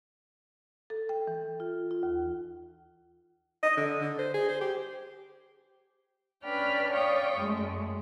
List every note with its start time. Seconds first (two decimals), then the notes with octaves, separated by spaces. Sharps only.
0.90 A4
1.09 G5
1.27 E3
1.60 F4
1.91 F4
2.03 D#2
3.63 D#5
3.77 D3
4.00 D3
4.19 C5
4.34 G#4
4.48 C5
4.61 G4
6.45 C#4 D4 B4 D5 G5 F6
6.91 C#5 D5 F5 G5 C#6 D#6
7.37 F#2 G#3 A3